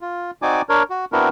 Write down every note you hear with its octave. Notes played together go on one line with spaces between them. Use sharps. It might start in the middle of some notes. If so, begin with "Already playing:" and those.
F4
C4 D#4 F#4 D5 G#5 D6
D4 A#4 C#5
F#4
B3 C4 D4 E4 F#4 A#4